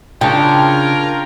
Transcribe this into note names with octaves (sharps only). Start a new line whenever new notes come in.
C#3 D4 F4 A#4 C#5 G5 A5